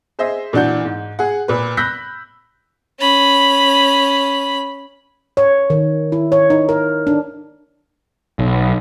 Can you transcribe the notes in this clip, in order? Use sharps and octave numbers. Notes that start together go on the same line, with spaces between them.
G#4 C5 D#5 E5
A#2 E3 D4 F#4 G6
G#2
G#4 F#5
A#2 B4
B5 E6 F#6 G6 A#6 B6
C#4 B5
C#5
D#3
E4
C#5
D#4
A#4
D4
B1